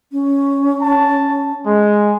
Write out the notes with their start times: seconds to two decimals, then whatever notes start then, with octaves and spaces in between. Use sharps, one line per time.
0.12 C#4
0.82 A5
1.66 G#3